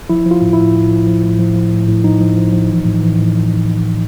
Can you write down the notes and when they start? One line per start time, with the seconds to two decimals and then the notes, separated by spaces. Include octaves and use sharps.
0.10 F3 E4
0.26 F3
0.31 F4
0.42 A2
0.53 A2 E4
0.75 A2
0.91 F3
1.07 F3
1.23 A2
1.39 F3
1.56 F3
1.72 A2
1.88 A2
2.04 F3 D#4
2.21 F3
2.37 F3
2.53 F3
2.70 E3
2.86 A2
3.02 E3
3.18 A2